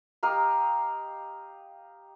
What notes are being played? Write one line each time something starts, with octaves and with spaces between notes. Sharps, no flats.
G4 D#5 F5 A#5